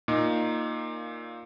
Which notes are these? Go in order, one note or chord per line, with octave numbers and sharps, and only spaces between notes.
A#2 A#3 D#4